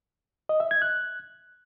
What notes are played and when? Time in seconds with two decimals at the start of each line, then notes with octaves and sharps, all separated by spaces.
0.49 D#5
0.60 E5
0.71 G#6
0.82 F#6